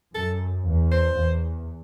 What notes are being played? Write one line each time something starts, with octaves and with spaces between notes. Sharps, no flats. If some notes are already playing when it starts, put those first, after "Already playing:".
F#2 A4
E2
C5
E2